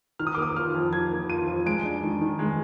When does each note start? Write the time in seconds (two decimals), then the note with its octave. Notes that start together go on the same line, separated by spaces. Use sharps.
0.19 D#3 F6
0.27 D#6
0.35 D6
0.37 A#3 D#6
0.56 F4 F6
0.74 F2
0.93 D#3 G#6
1.11 A#3
1.29 F4 D#7
1.48 F2
1.66 G#3 D7
1.85 D4
2.03 D#3
2.21 D#3
2.39 G#3